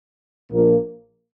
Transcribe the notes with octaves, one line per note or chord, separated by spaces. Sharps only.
A#1 A#2 F3 A#3